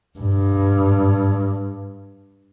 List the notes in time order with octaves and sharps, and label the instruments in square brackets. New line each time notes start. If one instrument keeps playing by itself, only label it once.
[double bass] G2